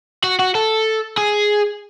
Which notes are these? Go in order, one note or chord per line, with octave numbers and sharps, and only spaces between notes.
F#4
F#4
A4
G#4